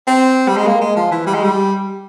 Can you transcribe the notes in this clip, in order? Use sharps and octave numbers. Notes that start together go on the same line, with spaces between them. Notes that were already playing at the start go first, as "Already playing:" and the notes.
C4
G3
G#3
A#3
G#3
F3
E3
G3
G#3
G3